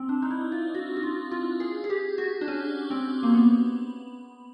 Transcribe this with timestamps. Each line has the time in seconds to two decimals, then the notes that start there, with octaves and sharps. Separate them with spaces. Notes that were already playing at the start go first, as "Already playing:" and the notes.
Already playing: C4
0.09 D4
0.22 D#4
0.31 E4
0.52 F4
0.75 F#4
0.97 F#4
1.03 F4
1.31 F4
1.60 G#4
1.84 G#4
1.90 G4
2.18 F#4
2.41 D4
2.48 C#4
2.90 C4
3.23 A#3
3.34 B3